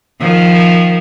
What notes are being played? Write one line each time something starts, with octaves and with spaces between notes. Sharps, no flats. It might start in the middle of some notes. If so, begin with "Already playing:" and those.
D#3 F3